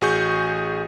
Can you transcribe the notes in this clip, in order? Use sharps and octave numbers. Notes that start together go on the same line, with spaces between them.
A1 F#4 G#4 C#6 G6